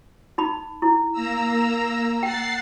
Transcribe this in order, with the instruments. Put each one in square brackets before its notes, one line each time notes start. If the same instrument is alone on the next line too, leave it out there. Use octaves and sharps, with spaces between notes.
[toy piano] D#4 B5
E4
[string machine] A#3 A#5 E6
[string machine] F#5 A6 C7 [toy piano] G5